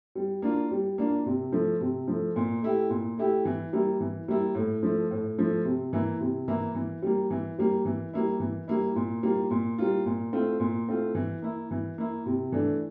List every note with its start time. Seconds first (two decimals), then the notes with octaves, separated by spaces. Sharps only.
0.15 G3
0.42 A#3 D4 F4
0.71 G3
0.98 A#3 D4 F4
1.26 C3
1.52 F3 A3
1.81 C3
2.08 F3 A3
2.36 A#2
2.62 A3 E4 G4
2.90 A#2
3.18 A3 E4 G4
3.45 E3
3.73 G3 A#3 E4
4.00 E3
4.28 G3 A#3 E4
4.55 A2
4.83 F3 A3
5.11 A2
5.38 F3 A3
5.65 C3
5.93 E3 A#3 E4
6.21 C3
6.48 E3 A#3 E4
6.75 E3
7.02 G3 A#3
7.31 E3
7.58 G3 A#3
7.85 E3
8.13 G3 A#3 E4
8.40 E3
8.68 G3 A#3 E4
8.96 A#2
9.23 G3 A#3 F4
9.51 A#2
9.78 G3 A#3 F4
10.06 A#2
10.33 A3 C4 F4
10.60 A#2
10.88 A3 C4 F4
11.15 E3
11.42 A#3 E4
11.71 E3
11.98 A#3 E4
12.26 C3
12.52 E3 A3 D4